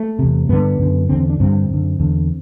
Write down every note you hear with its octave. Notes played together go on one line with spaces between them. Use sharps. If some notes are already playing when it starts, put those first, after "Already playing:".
Already playing: A3
E2 C3
G2 D3 B3
F#2 D3
E2 D3 C4
C4
D4
G2 D3 C4
F#2 D3
E2 D3